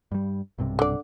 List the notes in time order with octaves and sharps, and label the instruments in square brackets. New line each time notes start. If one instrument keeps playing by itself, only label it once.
[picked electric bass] G2 G3
B1 G2 C3
[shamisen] D3 D5